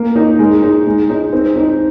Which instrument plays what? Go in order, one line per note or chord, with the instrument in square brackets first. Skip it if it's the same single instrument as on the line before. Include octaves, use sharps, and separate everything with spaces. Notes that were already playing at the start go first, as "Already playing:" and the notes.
Already playing: [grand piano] A#3
D#4
G#3
D#4
G#3
D#4
C4
D#4